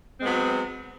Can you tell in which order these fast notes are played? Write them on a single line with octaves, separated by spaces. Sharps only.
C4 G#3 B3 F#3